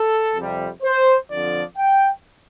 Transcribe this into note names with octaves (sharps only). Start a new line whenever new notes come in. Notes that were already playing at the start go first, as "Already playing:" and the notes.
Already playing: A4
F2 C3 G3
C5
F2 D3 F3 D5
G5